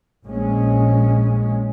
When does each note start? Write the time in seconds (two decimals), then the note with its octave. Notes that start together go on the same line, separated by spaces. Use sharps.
0.24 A#1 A#2 G#3 C#4